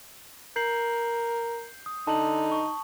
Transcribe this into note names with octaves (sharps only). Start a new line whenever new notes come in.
A#4 G6 C7 F#7
D#6
D3 D#4 A5 F#7
C#6